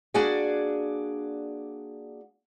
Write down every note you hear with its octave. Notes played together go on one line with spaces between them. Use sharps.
A#3 D4 F#4 G#4 D5 G#5